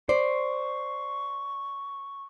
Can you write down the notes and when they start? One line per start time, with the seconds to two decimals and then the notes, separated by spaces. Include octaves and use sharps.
0.09 C5 D5 C#6